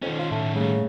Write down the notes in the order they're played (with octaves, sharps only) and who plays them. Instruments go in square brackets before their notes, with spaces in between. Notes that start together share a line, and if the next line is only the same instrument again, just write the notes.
[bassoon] F2 [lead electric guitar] D#3 C#4
[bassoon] F4
[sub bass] A2 [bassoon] A3
[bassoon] C#3 [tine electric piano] G3 A3 A#3